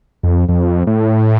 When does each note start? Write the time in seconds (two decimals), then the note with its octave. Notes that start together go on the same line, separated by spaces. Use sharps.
0.23 F2
0.49 F2
0.87 A2